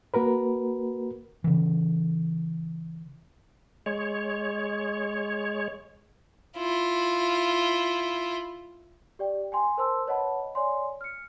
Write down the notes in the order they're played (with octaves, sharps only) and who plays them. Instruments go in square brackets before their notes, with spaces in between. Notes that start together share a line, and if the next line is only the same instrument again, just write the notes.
[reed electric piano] A#3 F#4 A#4 B4
[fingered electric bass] C#3 E3
[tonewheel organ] G#3 C#5
[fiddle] E4 F4
[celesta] G4 D5 G5
G5 G#5 C6
A#4 C5 A5 C6 E6
B4 C#5 D#5 F#5 A5 B5
C#5 D5 G#5 C6
F6 C#7